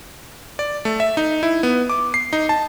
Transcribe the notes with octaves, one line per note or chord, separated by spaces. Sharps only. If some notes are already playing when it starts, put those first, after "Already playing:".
D5
A3
E5
D#4
E4
B3
D6
C7
D#4
A5